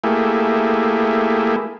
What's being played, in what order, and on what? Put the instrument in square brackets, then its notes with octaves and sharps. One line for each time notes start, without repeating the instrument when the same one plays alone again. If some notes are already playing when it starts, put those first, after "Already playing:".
[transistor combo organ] A3 A#3 E4 G4 G#4